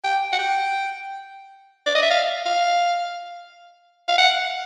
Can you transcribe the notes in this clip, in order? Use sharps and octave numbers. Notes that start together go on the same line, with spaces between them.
G5
F#5
G5
D5
D#5
E5
F5
F5
F5
F#5